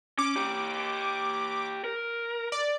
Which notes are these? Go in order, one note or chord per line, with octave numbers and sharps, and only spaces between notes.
C#4 D6
G4 C#5
A#4
D5